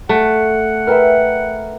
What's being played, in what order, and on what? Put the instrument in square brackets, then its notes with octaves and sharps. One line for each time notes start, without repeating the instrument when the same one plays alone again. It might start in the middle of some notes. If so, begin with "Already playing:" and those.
[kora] A3 [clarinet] F#5
[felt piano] A#4 B4 [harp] E5 G5 F6